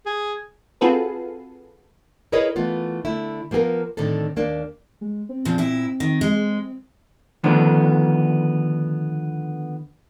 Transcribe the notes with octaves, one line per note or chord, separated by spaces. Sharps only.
G#4
C4 F4 F#4 G#4 A4 B4
E4 G#4 A#4 B4 C#5 D#5
E3 A3 B3 F4
D3 A3 E4
F3 A#3 B3 G#4 A#4
A2 D3 D#3 C4 A4
D#2 A#3 D4
G#3
C4
A#2 C#3 F3 C4
A#2 E4
D#3
G#3
D3 D#3 F3 A3 B3 D4